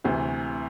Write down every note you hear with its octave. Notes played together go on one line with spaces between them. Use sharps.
D2 C3 E3